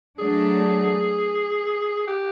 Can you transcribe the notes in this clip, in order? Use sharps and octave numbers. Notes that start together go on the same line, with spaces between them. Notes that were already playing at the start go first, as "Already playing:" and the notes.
F#3 A3 D4 G#4
G4